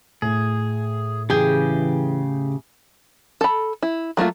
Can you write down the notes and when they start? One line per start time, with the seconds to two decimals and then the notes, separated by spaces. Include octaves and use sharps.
0.22 A2 G#4
1.30 C#3 E3 G4 G#4 G5
3.41 A4 B5
3.83 E4
4.17 F#3 A3 A#3 F4